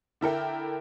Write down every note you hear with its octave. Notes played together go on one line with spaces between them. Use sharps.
D3 E4 A#4 G5